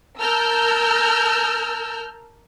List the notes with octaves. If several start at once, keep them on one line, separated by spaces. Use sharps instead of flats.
A#4 A5 E6 F6 G6